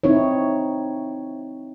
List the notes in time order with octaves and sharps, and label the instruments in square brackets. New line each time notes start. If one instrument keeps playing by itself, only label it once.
[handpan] C4 D#4 E4 C#5